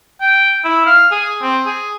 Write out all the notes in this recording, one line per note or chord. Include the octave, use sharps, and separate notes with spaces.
G5
E4
F5
G#4
C4
G#4